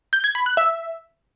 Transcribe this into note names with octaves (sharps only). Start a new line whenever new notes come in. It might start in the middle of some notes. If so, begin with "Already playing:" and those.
G6
G#6
B5
F#6
E5